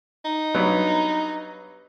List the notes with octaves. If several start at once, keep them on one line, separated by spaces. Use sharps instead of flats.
D#4
G2 F#3 B3